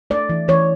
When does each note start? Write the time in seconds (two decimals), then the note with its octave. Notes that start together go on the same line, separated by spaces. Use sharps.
0.10 A3 D5
0.29 E3
0.48 E3 C#5